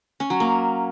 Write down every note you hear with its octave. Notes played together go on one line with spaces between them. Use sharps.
C#4
F#3
A#3